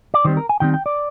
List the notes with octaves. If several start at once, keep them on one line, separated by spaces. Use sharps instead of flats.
D5
D#3 G3 C4 C5
A#4
G#5
D#3 G3 C4 G5
G5
D5